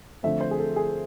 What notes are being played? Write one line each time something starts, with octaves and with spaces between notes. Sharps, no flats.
D3 F3 A3 C4 E5
C5
G#4
A4
G#4